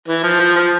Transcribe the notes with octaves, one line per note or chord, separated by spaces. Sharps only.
E3
F3
F3
F3